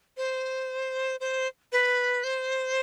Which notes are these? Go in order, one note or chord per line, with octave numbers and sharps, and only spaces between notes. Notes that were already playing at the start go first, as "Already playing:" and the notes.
C5
C5
B4
C5